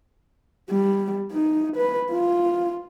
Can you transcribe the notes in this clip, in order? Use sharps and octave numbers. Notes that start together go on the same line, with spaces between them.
G3
D#4
B4
F4